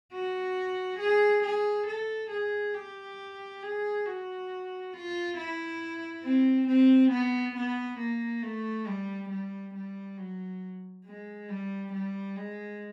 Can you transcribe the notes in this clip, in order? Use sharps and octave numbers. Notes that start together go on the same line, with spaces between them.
F#4
G#4
G#4
A4
G#4
G4
G#4
F#4
F4
E4
C4
C4
B3
B3
A#3
A3
G3
G3
G3
F#3
G#3
G3
G3
G#3